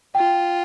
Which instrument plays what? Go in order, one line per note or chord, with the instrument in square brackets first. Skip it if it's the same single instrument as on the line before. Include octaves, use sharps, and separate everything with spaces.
[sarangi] F4 [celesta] G5